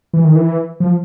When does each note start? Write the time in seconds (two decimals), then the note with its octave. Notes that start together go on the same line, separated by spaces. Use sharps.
0.13 E3
0.24 D#3
0.36 E3
0.80 F3